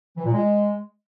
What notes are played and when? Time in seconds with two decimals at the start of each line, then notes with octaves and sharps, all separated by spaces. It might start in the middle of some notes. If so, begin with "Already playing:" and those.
0.17 E3
0.25 A#2
0.33 G#3